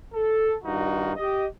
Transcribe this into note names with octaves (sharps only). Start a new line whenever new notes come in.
A4
G2 D#3 D#4 F4 F#4
G4 D#5